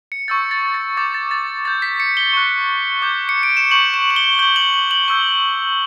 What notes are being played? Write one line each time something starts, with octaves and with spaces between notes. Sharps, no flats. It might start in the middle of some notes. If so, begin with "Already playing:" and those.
C#7
C#6 E6 G6 A6
A6
A6
D6 G6 A6
A6
A6
D6 G6 A6
B6
C#7
G7
C#6 F#6
D6 G6
C#7
D7
E7
C#6 G6 F#7
E7
F#7
G7
C#6 G6 G7
F#7
F#7
F#7
C#6 E6 G6 G7